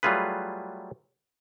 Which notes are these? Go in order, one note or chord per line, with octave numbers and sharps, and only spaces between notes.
F#3 G3 A3 F4 G#4 B4